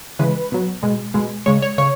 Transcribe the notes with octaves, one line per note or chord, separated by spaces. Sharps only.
C#3 E3 G#3 B4
B2 F#3
B2 G#3
B2 G#3
C#3 G#3 C#5
C#5
C#3 C#5